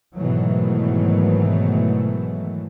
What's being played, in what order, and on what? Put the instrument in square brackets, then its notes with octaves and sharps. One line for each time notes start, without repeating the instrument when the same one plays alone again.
[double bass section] G#2 B2 D#3 E3 F#3 A3